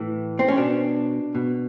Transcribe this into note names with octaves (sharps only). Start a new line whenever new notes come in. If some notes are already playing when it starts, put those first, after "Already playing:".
Already playing: A2 E3
C4
C#4
B2 D4
B2